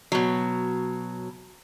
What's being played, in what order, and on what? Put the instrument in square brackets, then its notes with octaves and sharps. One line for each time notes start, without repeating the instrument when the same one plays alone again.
[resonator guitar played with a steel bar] B2 F#3